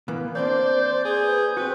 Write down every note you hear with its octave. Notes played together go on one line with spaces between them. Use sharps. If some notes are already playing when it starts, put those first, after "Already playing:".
E3 A#3 B3
A#3 C4 D4 C5 D5 G6
G#4 G6
B4
C4 F#4 B4